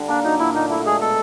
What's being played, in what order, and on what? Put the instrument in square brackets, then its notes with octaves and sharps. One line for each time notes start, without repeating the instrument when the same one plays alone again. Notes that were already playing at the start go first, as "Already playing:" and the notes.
Already playing: [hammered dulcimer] D3 G3
[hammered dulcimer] A#3 [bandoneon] D4
[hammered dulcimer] F#3 [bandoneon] D#4
[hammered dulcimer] A#2 [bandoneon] E4
[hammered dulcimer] A#2 [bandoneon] D#4
[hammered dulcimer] A3 [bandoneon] E4
[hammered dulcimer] G#3 [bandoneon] G#4
[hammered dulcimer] B2 [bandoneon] A4